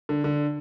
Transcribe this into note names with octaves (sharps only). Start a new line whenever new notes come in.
D3
D3